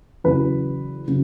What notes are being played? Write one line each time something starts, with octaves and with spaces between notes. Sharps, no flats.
E2 C#3 F#3 B4
C#3 F#3